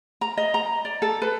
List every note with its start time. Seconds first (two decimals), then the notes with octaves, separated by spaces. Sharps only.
0.21 A#5
0.37 D#5
0.54 A#5
0.85 D5
1.02 A4
1.22 B4